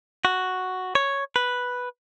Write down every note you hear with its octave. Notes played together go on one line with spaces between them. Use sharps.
F#4
C#5
B4